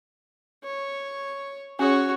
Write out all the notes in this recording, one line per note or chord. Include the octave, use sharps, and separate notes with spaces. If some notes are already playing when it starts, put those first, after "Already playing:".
C#5
C#4 F#4 G#4 C#5